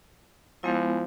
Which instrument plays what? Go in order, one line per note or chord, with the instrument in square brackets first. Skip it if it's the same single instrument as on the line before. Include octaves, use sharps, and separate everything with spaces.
[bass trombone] F3 [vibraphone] G#3 B3 E4